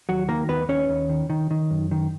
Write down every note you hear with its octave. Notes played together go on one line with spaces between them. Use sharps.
D#2 F#3 F#4
D#3 A#3 A#4
D#2 B3 B4
D#2 C#4 C#5
D#2
D#3
D#3
D#3
F#2
D#3